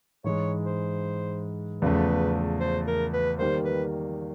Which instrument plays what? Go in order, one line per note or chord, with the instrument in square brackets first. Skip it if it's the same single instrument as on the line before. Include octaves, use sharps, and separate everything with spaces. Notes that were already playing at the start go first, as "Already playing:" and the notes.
[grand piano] G#2 E3 G#3 [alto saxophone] C#5
[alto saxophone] C5
[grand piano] E2 C#3 F3 A3 [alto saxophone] B4
[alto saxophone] C5
A#4
B4
[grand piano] D#3 G3 A#3 [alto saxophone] C5
[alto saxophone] B4